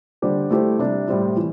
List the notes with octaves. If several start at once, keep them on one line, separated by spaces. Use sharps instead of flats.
D3 G3 D4 G4 C5
A3 E4 G4 C5
C3 G3 D4
A2 G3 C4 E4
E3